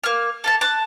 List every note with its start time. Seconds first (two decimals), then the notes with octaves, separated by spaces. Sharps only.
0.04 A#3 F6
0.44 A4 F5 A5
0.61 A5 F#6